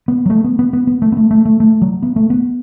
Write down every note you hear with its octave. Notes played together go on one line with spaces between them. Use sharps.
B3
F#3
A3
B3
B3
B3
B3
A3
B3
A3
A3
A3
A3
F#3
B3
A3
B3